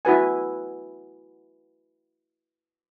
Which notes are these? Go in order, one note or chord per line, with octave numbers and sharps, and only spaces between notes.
E4 F#4 B4 G#5